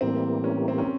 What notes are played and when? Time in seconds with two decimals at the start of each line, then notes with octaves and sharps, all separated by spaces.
0.01 A2 E3 G3 A#3 C4
0.44 C#4
0.68 C4
0.78 C#4